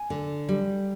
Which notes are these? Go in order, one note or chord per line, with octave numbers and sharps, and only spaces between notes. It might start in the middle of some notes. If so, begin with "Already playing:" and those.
Already playing: G#5
D3
G3